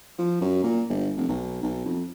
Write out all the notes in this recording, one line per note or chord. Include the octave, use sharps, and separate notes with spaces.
F3
F#2
A#2
G1
F1
B1
B1
F2